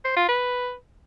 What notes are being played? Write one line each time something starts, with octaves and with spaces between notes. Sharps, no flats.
C5
F4
B4